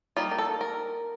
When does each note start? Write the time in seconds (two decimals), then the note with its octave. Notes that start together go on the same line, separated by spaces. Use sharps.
0.17 G3 A#3 D#4 F4
0.31 A#4
0.38 A4
0.61 A#4